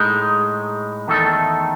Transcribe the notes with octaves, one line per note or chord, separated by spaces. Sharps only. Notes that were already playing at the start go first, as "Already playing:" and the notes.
Already playing: A2 G#3 D#4
E2 D#3 A3 D#4 A4